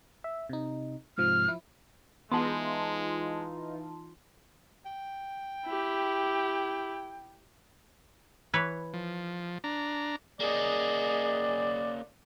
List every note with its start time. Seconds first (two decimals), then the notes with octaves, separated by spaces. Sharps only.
0.24 E5
0.49 C3 D#4
1.18 G#2 C3 F3 F6
1.48 F3 E4
2.32 E3 G#3 B3 D#4 F4 G#4 A5 C6
4.85 G5
5.66 E4 G4
8.54 E3 B4 C#5
8.94 F3
9.64 D4 A#5
10.40 A#3 C#4 G#4 D5 D#5